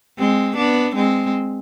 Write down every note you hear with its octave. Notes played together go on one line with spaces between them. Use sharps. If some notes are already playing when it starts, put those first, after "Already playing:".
G#3 C4
B3 D4
G#3 C4